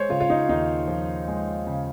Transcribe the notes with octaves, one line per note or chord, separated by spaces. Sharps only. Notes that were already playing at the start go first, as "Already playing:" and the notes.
Already playing: G#3 C5 C#5
C#3 F4
F4
D#4
D#2 D#4
F3
G#3
C#3